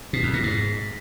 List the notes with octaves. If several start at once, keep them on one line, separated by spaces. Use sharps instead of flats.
B2
F2
A#2
G#2